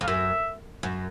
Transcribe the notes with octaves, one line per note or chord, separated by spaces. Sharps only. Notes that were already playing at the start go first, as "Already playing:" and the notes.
F2 F5
F#2 E5
F#2